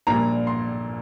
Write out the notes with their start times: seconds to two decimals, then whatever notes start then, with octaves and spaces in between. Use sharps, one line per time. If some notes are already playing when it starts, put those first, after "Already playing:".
0.07 A#1 A#2 G3 A#3 A#5
0.47 C6